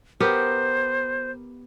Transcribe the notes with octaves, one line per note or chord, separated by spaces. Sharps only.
B3 G4 A#4 C5